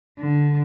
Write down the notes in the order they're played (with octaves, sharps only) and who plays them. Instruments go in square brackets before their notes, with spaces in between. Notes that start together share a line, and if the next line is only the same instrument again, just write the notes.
[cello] D3